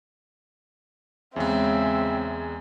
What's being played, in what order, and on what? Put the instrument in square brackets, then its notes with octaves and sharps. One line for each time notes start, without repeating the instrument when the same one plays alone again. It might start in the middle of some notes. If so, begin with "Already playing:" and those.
[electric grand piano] E2 G#3 [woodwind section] C#3 [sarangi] C4 [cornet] E5